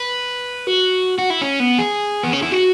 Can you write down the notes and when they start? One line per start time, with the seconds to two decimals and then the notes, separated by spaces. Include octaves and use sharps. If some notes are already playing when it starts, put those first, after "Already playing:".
Already playing: B4
0.67 F#4
1.18 F#4
1.30 E4
1.41 C#4
1.60 B3
1.79 G#4
2.23 B3
2.33 C#4
2.42 E4
2.52 F#4